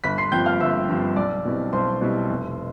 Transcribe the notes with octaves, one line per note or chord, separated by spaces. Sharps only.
G1 B5 B6
C6 C7
G2 F3 C4 G5 G6
F5 F6
G1 E5 E6
G2 F3 C4
B1 D5 D6
B2 G3 C4 E4
B1 C5 C6
B2 G3 C4 E4
F1